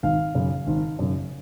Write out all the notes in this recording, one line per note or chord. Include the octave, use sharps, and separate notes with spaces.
G#1 F5
F#2 C#3
G#1
F#2 C#3